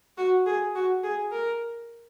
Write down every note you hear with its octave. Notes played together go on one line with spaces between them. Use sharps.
F#4
G#4
F#4
G#4
A#4